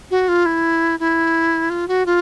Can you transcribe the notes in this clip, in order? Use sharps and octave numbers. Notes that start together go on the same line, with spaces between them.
F#4
F4
E4
E4
F4
F#4
F4